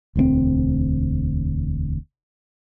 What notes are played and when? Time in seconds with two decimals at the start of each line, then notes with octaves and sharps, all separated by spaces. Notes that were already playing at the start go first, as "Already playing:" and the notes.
0.16 E1 D2 A#3 C4